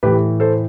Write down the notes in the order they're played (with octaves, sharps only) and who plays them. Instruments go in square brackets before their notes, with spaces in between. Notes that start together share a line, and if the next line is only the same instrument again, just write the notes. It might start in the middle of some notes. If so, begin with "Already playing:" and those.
[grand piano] A2 E3 G4 B4
A4 C5